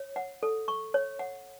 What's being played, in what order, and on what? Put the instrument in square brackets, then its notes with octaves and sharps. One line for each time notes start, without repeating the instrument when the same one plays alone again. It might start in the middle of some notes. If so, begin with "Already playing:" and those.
Already playing: [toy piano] C#5
F#5
A4
C#6
C#5
F#5